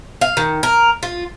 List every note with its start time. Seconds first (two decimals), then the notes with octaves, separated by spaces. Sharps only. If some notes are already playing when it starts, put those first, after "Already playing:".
0.21 F5
0.37 D#3
0.63 A#4
1.03 F4